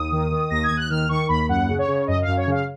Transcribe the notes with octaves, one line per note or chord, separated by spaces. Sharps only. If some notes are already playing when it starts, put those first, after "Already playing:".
Already playing: D#2 D#6
D#3
D#3
D#2 A#6
G#6
D#2
F#6
D#3 F6
D#3 C#6
D#2 B5
F#2 F#5
C#3
C#5
C#3
F#2 D#5
F5
F#2
C#5
C#3 F5